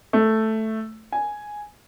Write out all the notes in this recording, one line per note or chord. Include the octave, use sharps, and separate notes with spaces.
A3
G#5